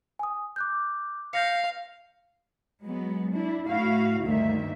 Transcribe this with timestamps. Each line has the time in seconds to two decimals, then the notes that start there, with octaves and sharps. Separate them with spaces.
0.19 G#5 D#6
0.56 D6 F#6 G6
1.33 F5 G6 A#6 C#7
2.84 F#3 G#3 B3
3.32 D4 E4
3.68 A2 E4 F#4 F5
4.23 D2 G2 D#3 A#3 E5